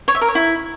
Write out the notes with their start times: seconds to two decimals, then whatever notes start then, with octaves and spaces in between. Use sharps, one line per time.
0.08 C#5
0.15 E5
0.21 A#4
0.28 C#5
0.35 E4